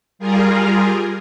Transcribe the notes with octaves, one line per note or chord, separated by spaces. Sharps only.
G3 F4 G#4 A#4